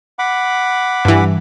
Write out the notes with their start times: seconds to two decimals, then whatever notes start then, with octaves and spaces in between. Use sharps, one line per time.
0.19 F#5 B5 D6
1.05 G2 E3